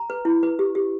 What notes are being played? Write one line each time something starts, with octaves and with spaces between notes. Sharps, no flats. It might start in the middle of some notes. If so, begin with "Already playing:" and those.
Already playing: A#5
B4
E4
B4
G4
G4